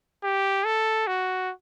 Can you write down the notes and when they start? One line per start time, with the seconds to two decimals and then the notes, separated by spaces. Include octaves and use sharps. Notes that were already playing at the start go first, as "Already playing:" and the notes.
0.23 G4
0.65 A4
1.07 F#4